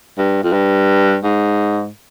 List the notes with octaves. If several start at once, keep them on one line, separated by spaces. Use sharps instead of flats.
G2
F2
G2
G#2